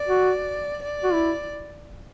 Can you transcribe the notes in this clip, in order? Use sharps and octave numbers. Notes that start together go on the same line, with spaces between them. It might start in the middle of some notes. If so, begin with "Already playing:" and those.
Already playing: D5
F#4
D5
F#4
E4